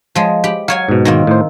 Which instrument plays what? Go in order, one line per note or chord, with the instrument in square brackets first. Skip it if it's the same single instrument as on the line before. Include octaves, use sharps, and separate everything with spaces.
[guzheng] F3 G#3
G4 B5
[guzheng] F#3 C#5 G#5 [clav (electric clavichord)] F5
[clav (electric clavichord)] G#2 B2
[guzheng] D#3 A#3 C4
[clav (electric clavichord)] A2 C5